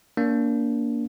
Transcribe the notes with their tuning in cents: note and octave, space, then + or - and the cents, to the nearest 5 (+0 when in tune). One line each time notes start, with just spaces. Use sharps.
A#3 +5 D4 -30